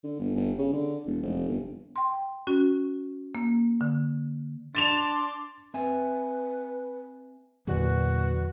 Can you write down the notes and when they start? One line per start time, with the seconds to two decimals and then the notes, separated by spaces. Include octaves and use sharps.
0.03 D3
0.19 G1
0.36 G1
0.58 C#3
0.73 D3
1.06 E1
1.23 F1
1.48 G1
1.96 G5 C6
2.47 C#4 F#4
3.35 A#3
3.81 D3
4.75 D4 C6 D6 A6 E7 F7
5.74 C4 B4 E5 G#5
7.67 E2 A#2 D3 F#3 F#4 B4